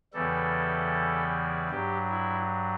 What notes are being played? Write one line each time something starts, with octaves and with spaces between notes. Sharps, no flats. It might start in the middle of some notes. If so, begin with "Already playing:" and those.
E2 C#3 E3 G3 A4
G2 F#3 G4
E4